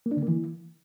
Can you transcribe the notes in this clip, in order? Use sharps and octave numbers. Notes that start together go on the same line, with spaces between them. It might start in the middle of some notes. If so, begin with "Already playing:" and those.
A#3
D4
D3
A#3
E3